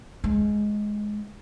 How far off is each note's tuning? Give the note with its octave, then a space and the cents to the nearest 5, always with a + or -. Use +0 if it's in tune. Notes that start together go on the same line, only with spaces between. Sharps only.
G#3 +10